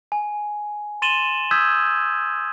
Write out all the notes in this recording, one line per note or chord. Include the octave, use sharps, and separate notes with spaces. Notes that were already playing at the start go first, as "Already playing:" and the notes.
G#5
C6 A6 D#7 E7 F#7 G7
D#6 E6 G6 G#6 B6